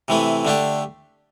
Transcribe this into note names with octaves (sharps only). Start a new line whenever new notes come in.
C3 E3 A3 E4
D3 A3 D4 G4